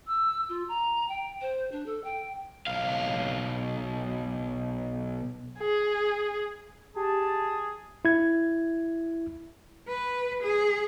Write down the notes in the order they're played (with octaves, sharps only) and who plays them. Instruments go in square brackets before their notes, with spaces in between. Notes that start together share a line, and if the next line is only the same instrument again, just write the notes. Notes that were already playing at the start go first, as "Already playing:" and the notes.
[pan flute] E6
F4
A#5
G5
C5
D4
A4
G5
[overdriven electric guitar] B1 F5
[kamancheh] G#4
[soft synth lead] G4 [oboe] G#4 [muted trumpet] A5
[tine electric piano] E4 G#6
[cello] B4
G#4